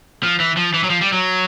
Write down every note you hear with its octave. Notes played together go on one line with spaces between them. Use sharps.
F3
E3
F3
E3
F#3
F3
G3
F#3